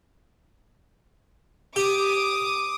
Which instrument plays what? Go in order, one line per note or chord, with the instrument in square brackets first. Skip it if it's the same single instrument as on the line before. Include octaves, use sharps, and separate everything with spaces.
[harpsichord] G4 [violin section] D6 D#6